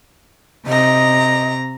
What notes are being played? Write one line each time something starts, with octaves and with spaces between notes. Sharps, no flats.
C3 D#5 A#5